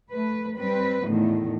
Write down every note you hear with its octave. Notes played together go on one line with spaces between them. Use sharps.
A3 B4
G3 C4 B4
E2 A2 D#3